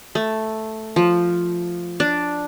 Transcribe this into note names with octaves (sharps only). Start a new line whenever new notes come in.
A3
F3
D4